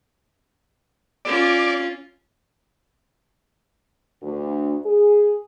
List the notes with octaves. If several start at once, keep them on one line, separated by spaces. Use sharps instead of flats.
C#4 F4 D5
D2
G#4